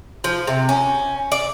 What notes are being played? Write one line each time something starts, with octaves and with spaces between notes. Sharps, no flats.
F3
C3
C#4
D5